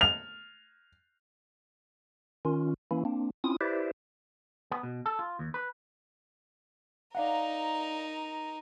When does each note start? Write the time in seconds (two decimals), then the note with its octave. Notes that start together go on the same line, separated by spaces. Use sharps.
0.01 F7
2.45 D#3 C#4 F4
2.91 E3 A#3 C#4 E4
3.05 A#3 C4 D4
3.44 C4 C#4 E4 F4 D#6
3.61 E4 G4 B4 C5 D5 E5
4.72 B3
4.83 B2
5.06 A4
5.19 F4
5.39 D#2
5.54 B4
7.15 D#4 A#4 D5 F5 F#5